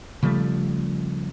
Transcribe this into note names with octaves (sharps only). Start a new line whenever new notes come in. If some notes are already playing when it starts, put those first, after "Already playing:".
C#3 F3 G3 A3